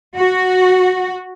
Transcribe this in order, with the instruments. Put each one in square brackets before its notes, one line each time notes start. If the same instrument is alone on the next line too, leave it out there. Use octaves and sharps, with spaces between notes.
[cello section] F#4